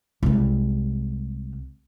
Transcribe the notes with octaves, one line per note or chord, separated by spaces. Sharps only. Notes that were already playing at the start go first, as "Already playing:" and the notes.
C2 G#3